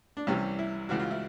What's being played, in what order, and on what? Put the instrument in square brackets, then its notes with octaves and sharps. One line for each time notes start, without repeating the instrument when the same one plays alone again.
[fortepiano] D4
C2 C3 E3 G3 C#4
E4
C#2 C#3 E3 F#4
F4
E4